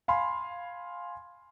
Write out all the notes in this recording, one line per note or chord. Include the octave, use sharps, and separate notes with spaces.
F5 G#5 B5 C6